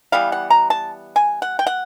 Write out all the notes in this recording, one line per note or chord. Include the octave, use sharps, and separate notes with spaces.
E3 G3 B3 F5
F#5
A#5
A5
G#5
F#5
G5
F#5